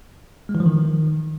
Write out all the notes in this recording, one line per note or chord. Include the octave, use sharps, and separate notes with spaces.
G#3
E3
F3
D#3